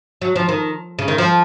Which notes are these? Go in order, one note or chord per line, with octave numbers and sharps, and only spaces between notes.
F#3
F3
D#3
C#3
D#3
F3